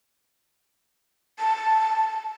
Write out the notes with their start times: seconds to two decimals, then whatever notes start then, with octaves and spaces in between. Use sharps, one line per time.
1.39 A5